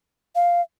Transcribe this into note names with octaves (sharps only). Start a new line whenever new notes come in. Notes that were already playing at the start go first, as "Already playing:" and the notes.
F5